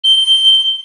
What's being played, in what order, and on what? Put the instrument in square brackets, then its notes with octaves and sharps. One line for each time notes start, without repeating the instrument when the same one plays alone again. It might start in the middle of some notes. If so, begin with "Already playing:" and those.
[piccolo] G7